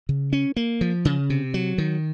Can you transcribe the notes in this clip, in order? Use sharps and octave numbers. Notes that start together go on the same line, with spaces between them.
C#3
C#4
A#3
F3
C#3
C3
F#3
D#3